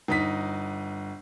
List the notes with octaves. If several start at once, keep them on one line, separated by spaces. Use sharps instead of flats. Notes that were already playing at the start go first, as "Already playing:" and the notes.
G1 D#4 B6